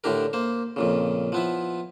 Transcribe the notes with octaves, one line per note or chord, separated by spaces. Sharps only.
A2 D3 D4 G4 A#4
A#3 C5
F2 A#2 C#3
F3 B3 E4